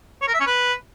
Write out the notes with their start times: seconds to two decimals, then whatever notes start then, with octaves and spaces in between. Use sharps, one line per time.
0.21 C#5
0.28 A#4
0.34 E5
0.40 C#4
0.47 B4